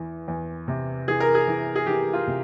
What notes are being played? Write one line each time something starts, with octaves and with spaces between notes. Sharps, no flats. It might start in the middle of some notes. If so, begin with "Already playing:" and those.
Already playing: E2 E3
E2
C3
E3 G#4
A#4
G#4
E3
G#4
E3 G4
F4
C3